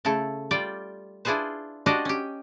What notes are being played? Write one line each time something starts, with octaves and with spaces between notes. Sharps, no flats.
C#3 A3 E4 A4
G3 F4 D5 G5
D4 E4 F4 G#4 B4 C5
D4 F#4 G4 C5 D5 D#5
C#4 G4